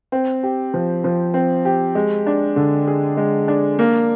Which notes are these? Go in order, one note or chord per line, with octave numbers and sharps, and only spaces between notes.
C4
G4
F3
F3
C4
G4
G#3
D4
D3
G#4
G#3
D4
A#3